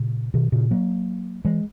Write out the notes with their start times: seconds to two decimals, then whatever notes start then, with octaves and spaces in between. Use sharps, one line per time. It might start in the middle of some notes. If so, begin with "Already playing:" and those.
Already playing: A#2 C#3
0.34 B2 D#3
0.52 A#2 C#3
0.71 F#3 A#3
1.45 E3 G#3